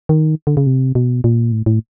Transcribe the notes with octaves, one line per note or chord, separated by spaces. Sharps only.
D#3
D3
C#3
C3
B2
A#2
A2
A2